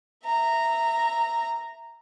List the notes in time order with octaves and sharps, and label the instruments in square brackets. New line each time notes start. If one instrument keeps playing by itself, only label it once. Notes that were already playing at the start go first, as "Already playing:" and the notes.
[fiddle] E5 A#5